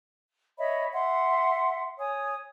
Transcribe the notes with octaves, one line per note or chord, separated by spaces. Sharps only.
C#5 D#5 E5 B5
E5 F#5 C6
C#5 G#5 D#6